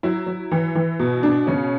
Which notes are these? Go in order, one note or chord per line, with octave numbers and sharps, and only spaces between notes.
F#3 E4
F#3
E3
E3
B2
B2 D4
C#3 C#4